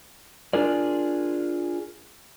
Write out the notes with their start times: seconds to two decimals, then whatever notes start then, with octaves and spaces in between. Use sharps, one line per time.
0.53 D4 F4 G#4 A#4 D5